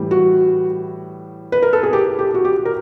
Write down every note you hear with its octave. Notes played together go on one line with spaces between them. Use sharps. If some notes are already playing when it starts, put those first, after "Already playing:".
Already playing: A2 E3 G3
F#4
B4
A#4
A4
G#4
G4
G4
F#4
G4
A#4